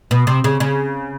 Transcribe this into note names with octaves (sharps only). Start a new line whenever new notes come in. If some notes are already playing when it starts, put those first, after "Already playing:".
B2
C3
C#3
C#3